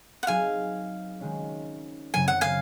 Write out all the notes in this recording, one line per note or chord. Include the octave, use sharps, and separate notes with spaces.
F#5
F#3 C4 D#4 G#4 F5 G#5
D#3 G#3 C#4
F#2 C#3 F#3 C4 G#5
F#5
F5 G#5